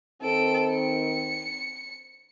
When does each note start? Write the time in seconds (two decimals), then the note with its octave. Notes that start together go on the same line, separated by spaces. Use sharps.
0.22 D#3 C4 A4 D7
0.73 C#7